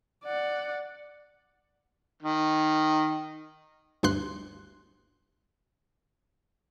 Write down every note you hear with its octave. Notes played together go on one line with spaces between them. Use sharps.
D5 F#5
D#3
G1 D2 G2 C6 F#6